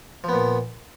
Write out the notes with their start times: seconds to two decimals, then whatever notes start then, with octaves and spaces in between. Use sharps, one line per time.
0.24 F3
0.29 B3
0.33 A#2